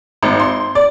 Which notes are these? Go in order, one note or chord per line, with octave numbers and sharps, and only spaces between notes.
G#1
C6
D5